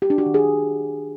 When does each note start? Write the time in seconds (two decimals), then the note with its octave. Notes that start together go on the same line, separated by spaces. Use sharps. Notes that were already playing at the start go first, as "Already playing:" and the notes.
0.02 G4
0.10 D4
0.18 F#4
0.26 D#3
0.34 G#4